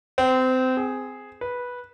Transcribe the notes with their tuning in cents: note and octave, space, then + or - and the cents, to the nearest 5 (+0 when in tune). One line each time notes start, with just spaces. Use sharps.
C4 -25
G#4 +0
B4 -10